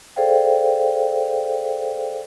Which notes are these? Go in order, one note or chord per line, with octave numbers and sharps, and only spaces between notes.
G#4 A4 C5 D5 F5 G5